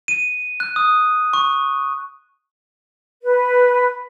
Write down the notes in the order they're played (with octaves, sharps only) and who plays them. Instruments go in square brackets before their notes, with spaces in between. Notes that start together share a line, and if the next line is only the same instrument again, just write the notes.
[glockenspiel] D#7
F#6
D#6
C#6
[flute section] B4